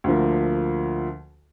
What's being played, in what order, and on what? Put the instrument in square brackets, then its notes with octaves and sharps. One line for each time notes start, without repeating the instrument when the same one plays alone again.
[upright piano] D2 D3 F3 A#3